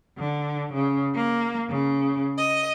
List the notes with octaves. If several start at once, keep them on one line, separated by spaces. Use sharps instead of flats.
D3
C#3
A#3
C#3
D#5